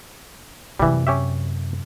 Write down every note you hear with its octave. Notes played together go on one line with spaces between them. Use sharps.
F#2 C3 E3 G3
C#4 G4 E5